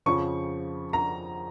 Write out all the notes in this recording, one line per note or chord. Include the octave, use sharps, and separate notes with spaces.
F2 C#3 F3 C#6
A#5